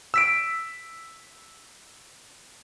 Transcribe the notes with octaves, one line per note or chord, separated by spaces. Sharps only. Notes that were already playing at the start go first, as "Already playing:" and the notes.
E6 B6 D7